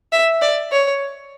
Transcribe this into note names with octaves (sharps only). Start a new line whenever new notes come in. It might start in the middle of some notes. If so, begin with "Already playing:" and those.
E5
D5
C#5